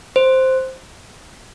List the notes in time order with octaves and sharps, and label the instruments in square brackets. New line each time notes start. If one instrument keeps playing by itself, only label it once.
[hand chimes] C5